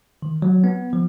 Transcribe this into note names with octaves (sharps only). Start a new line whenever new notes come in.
D#3
F#3
B3
F3